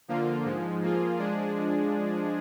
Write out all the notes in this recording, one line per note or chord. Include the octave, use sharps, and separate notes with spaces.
D3 F3 A#3 F4
G#2 F3 G#3
F3 A#3 F4 G#4
F3 G#3 D4 G#4